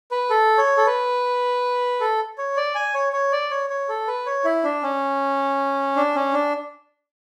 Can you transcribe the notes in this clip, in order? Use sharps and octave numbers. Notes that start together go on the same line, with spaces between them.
B4
A4
C#5
A4
B4
A4
C#5
D5
G#5
C#5
C#5
D5
C#5
C#5
A4
B4
C#5
E4
D4
C#4
D4
C#4
D4